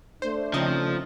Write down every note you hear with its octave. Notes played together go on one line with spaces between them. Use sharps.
A3 D4 C5
C#3 F3 C4 C#4 D#4 D#5